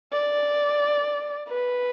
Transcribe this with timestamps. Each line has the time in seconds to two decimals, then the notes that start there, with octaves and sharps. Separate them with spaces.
0.12 D5
1.49 B4